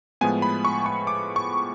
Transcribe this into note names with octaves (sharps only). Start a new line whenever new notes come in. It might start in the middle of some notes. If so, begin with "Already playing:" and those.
A2 F3 G#3 B3 G#5
B5
C#6
C#6
D6
C#6